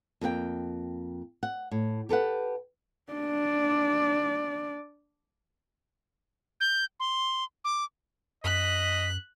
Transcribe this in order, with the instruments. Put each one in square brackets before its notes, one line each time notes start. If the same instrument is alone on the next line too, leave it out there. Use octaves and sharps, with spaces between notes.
[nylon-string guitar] F2 A#3 F4 G5
F#5
A2
G4 A4 B4 F#5
[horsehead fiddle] D4 D5
[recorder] G6
C6
D6
[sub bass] F#2 [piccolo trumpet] D#5 [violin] F#6 [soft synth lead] B6